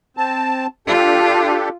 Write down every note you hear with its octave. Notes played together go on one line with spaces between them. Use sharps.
C4 A5
D4 F4 G4 A4